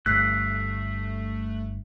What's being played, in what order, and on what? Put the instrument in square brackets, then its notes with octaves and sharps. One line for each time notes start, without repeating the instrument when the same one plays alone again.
[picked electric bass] G1 G2 [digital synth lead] A3 [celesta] E6 B6 C7 [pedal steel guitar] F#6